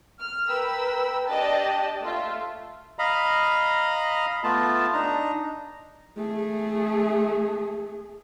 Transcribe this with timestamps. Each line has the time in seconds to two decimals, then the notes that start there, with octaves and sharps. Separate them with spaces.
0.19 F6
0.48 A#4 B4 G5 B5 E6
1.27 D4 G4 D5 D#5 A5
2.02 A3 F4 E5
2.99 D#5 F5 A#5 B5
4.44 A3 B3 F4 A5
4.93 D4 D#4 A#5
6.17 A3 G#4